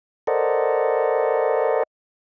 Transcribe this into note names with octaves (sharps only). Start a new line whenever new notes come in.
A4 A#4 C5 D5 D#5 F#5